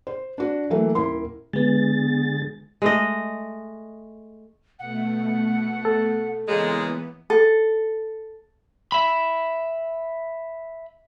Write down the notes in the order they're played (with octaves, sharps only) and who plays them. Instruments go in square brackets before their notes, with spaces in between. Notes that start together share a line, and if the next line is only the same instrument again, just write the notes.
[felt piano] C5
D4 F#4
E3 F#3 A3 A#3
D#1 A#3 E4 A#4 C6
[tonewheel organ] D3 G#4 A6 [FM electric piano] G#3 B3
[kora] G#3 A3 D#5
[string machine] B2 A3 [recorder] F#5
[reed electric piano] A4
[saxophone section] A#2 C#3 G#3 [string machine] E3 B3
[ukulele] A4
[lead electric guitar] E5 B5